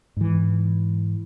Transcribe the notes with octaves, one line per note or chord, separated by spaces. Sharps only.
G#2 E3